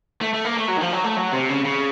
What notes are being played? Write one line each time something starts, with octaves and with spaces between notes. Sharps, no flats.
A3
A3
A#3
A3
F#3
D#3
F3
F#3
A3
F#3
C3
C#3
C#3